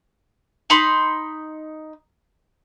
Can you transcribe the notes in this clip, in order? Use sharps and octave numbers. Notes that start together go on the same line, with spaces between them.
D#4 B5 C6